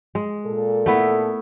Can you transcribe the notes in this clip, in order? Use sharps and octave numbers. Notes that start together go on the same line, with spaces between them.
G#3
A#2 A4
A3 B3 E4